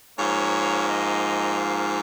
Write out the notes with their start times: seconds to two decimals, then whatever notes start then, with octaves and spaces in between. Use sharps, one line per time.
0.18 G#2 F3 A#3 C#5
0.89 D#5
1.59 F5